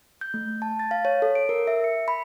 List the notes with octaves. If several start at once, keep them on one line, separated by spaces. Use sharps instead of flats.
G6
A3
A5
A6
F5
C#5
A4
D7
A#4
E5
C#7
B5